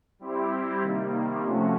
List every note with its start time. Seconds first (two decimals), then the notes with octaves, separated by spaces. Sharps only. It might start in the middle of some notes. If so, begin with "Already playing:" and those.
0.19 G3 C4 E4 G4
0.81 C3 D#3 G3 A#3
1.42 C3 F3 A3 C#4 F#4